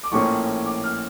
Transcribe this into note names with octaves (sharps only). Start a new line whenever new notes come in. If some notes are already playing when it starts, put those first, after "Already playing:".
D6
A#1 A2 F3 A#3 C#4 C#6
D6
F6